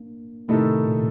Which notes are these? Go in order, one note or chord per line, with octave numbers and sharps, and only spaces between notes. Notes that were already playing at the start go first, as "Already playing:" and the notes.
Already playing: A#3 D4
A2 C3 D#3 A3 D#4 A4
A#2 D3